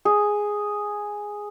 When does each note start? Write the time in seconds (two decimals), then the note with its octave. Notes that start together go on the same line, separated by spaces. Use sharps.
0.05 G#4